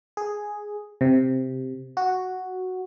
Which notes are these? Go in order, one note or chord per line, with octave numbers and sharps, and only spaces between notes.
G#4
C3
F#4